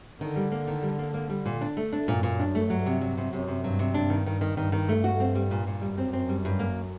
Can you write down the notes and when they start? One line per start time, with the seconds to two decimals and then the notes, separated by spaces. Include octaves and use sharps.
0.21 D3 D#3
0.36 G3
0.51 A#3
0.67 D#3
0.83 G3
0.99 A#3
1.14 A#3
1.30 G3
1.46 A#2
1.61 D4
1.77 A3
1.92 D4
2.08 F#2 A#2
2.23 A#2
2.39 D4
2.55 A3
2.70 G2 F#3
2.86 C3
3.01 F#3
3.17 C3
3.33 F#2 C3
3.48 C3
3.63 G2 F#3
3.79 C3
3.94 G2 D4
4.10 D#3
4.26 D#3
4.41 D#3
4.57 G2 D#3
4.72 D#3
4.89 A3
5.04 F#4
5.20 C4
5.35 G3
5.51 A#2
5.67 A#2
5.81 F#2 G3
5.98 C4
6.13 C4
6.29 G3
6.45 G2
6.59 A#3